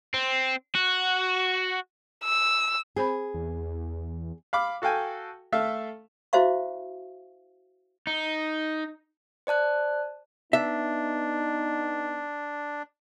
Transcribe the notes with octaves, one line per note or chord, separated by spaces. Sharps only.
C4
F#4
E6
C4 G#4 C5 B5
E2
F5 B5 D6
F#4 A4 F5 G5 G#5
A3 A4 E5 F5
E4 F#4 C5 E5 F5 C#6
D#4
C5 D5 A5 F#6
B3 D4 D#4 E5